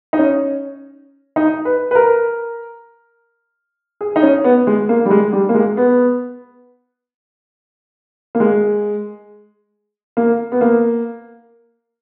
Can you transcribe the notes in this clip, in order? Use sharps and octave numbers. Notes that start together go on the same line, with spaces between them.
D#4
C#4
D#4
B4
B4
A#4
G#4
D#4
C#4
B3
G#3
A#3
G3
G#3
G3
A#3
G#3
B3
A#3
G#3
A#3
B3
A#3